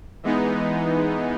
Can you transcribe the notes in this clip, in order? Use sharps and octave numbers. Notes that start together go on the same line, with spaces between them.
E3 G#3 B3 D#4